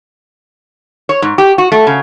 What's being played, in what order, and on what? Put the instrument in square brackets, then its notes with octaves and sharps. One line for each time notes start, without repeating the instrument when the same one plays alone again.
[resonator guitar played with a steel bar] C#5
G#2
G4
F#4
A3
C#3